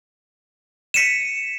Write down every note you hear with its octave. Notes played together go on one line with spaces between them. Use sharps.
B6 C#7 D#7 E7